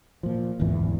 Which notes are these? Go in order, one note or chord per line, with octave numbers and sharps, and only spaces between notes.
A#2 F3
D1 G#1 E2 E3